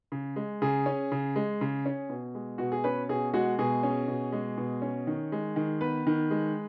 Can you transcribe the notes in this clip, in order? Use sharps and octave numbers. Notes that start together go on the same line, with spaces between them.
C#3
G#3
C#3 G#4
C#4
C#3
G#3
C#3
C#4
B2
G#3
B2 F#4
G#4
C#4 B4
B2 G#4
G#3 F#4
B2 G#4
C#4
B2
G#3
B2
C#4
D#3
G#3
D#3
B3 B4
D#3
G#3